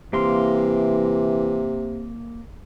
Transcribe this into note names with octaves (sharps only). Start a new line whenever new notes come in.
C3 E3 A#3 F5 C6